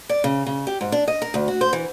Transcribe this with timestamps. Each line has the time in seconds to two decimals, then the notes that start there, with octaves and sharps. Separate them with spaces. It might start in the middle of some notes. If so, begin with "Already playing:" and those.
0.09 D5
0.24 C#3
0.46 C#3
0.67 G4
0.81 G#2
0.92 D4
1.08 D#5
1.22 A#4
1.34 D2
1.48 F#4
1.61 C5
1.73 E3